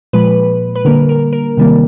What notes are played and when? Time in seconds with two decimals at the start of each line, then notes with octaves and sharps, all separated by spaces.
0.13 A#2 F3 G#3 B4
0.76 B4
0.85 D3 G3 A#3 A#4
1.09 A#4
1.33 A#4
1.57 C3 D#3 G3 A#3